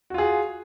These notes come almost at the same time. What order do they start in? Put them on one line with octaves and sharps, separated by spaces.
F#4 F4 G#4